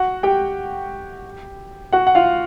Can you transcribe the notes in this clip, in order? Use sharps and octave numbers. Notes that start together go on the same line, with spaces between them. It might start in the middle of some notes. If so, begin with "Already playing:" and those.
Already playing: F#4 F#5
G4 G5
F#4 F#5
F#5
F4 F5